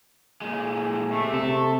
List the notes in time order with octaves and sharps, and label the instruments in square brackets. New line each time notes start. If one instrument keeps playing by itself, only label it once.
[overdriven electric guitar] A#2 G#3
[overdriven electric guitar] C3 [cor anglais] A3
[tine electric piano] C3 [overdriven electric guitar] A4